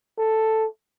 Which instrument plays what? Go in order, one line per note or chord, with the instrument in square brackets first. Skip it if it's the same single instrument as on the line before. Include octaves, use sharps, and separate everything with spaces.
[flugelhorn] A4